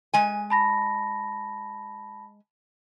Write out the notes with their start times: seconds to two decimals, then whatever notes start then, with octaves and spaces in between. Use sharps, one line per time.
0.14 G#3 G#5
0.50 A5 B5 A#6